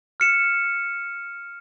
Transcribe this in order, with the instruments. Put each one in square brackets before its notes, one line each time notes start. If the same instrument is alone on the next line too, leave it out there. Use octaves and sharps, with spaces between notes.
[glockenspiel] F6 C#7 E7